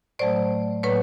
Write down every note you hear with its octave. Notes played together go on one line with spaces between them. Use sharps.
A2 F#3 A3 C5 D5
A2 F#3 A#3 B4 C#5